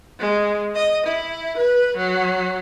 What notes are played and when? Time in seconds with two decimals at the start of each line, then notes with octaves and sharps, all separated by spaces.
0.19 G#3
0.75 D#5
1.06 E4
1.57 B4
1.97 F#3